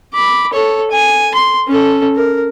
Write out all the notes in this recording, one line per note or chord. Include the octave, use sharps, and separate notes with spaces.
B5 D6
A4 C#5
G#5
C6
C#4 A4
A#4